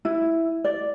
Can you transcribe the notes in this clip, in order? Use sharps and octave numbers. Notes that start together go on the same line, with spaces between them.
E4
D5